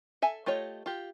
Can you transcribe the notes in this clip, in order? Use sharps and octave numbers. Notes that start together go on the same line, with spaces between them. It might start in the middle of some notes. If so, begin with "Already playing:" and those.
A4 E5 G#5
A3 F4 G4 C#5 D#5
F4 G4